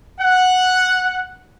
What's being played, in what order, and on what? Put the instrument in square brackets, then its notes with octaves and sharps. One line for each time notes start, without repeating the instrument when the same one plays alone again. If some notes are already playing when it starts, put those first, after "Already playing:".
[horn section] F#5